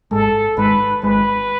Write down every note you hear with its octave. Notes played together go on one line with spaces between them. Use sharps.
G#1 G#2 G#3 A4
G#1 G#2 G#3 B4
G#1 G#2 G#3 B4